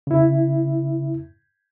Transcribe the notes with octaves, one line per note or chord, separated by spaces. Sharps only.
C#3 E4